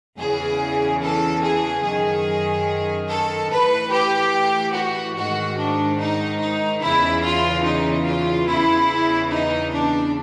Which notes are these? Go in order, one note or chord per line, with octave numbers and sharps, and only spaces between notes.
E2 C#3 E3 G#4
A4
G#4
F#2 D#3 G#4
A4
A2 E3 B4
G4
F#4
G#2 D#3 F#4
D4
D#4
D#4
E2 C#3 E3 E4
F4
D#4
F4
E2 C#3 E3 E4
D#4
D4